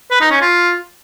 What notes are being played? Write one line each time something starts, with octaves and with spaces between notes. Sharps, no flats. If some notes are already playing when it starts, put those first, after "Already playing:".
B4
D#4
C#4
F4